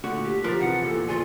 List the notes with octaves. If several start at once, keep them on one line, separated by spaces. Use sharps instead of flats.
A#2 D3 A3 F#4
G4
F3 A#4 F#6 A6
C3 E3 G#4 F#5
E2 A#2 A4
D2 F4 G#4